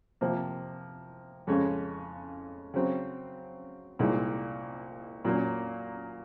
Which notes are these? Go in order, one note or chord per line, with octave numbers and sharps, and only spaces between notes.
C3 F3 A#3
F2 C#3 G#3 C#4
C#3 F#3 C4
C2 A#2 G#3 D#4
A#2 F#3 A#3 C#4